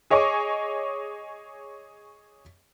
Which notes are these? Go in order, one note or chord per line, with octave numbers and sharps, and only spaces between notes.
G#4 C#5 D#5 G#5 C#6 D6